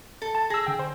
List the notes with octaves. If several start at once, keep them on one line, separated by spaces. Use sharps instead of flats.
A4
A5
G#4 E6 A#6
D3 G5
C5